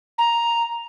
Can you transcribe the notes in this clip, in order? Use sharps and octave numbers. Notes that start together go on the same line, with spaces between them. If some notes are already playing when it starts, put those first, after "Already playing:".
A#5